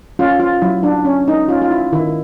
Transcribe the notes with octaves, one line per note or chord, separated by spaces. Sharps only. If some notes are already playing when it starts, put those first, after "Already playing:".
C#4 F4
F4
F#3 E4
D4
C#4
D#4
C#4 F4
F4
E4
D#3 E4